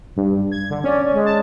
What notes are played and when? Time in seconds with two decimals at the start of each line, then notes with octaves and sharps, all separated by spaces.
0.16 G2
0.52 G#6
0.70 D3
0.84 C#4 D5
1.12 G#3
1.26 A5